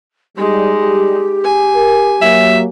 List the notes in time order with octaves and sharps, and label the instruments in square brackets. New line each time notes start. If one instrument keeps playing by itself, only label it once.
[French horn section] G3 [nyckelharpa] G#3 D#4 [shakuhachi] G4
[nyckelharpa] G#5
[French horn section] A#4
[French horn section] F#3 A#3 [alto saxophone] E5